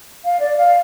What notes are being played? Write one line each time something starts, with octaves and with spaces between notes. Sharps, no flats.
F5
D5
F5